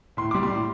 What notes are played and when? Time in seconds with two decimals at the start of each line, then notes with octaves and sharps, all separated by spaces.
0.17 A2 C6
0.31 G3 D6
0.43 C6
0.50 A2